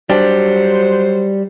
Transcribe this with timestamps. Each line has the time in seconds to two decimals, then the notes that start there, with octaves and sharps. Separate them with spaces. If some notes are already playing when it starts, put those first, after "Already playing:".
0.10 F#3 G3 D4 G4 C5